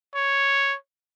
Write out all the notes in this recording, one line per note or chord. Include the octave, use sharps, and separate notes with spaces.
C#5